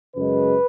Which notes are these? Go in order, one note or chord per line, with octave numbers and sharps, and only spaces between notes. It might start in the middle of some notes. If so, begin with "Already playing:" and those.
F#2 C#3 G#3 B4